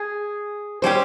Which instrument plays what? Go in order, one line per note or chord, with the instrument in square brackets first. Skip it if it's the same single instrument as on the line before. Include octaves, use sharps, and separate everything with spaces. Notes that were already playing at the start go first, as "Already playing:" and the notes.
Already playing: [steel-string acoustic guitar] G#4
[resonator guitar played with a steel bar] G3 C#4 G4 [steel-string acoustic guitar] C5